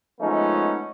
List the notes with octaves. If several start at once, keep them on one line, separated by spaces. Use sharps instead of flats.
F3 G#3 A3 B3 C#4 D#4